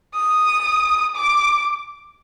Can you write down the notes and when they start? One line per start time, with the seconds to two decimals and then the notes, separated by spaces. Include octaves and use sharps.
0.16 D#6
1.16 D6